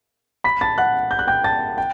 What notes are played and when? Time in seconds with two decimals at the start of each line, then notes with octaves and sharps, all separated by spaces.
0.44 B5 B6
0.61 A5 A6
0.78 F#5 F#6
1.11 G6
1.19 F#6
1.27 G5 G6
1.44 A5 A6
1.78 G5